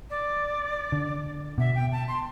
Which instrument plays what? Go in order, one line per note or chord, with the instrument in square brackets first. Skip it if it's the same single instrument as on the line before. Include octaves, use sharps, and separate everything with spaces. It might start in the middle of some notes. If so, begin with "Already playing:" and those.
[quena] D5
[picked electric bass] D3
[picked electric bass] B2 [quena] E5
[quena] G5
A5
C6